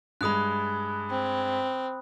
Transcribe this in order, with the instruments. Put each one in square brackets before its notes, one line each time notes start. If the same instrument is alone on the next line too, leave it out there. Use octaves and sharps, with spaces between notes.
[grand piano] G2 G#3 [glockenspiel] B5 D#6 F#6
[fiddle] C4